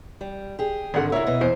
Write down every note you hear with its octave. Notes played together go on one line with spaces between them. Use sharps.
G3
G4 G#4
G#1 D3 A#4 F#5
C#3 E4 A#4 C#5 E5
B2 B3 D#5
E2 C5